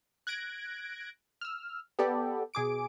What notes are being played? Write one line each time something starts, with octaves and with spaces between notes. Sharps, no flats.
F#6 G#6 A#6 D7
E6 F6
B3 G4 A4 D5
B2 G#4 D6 D7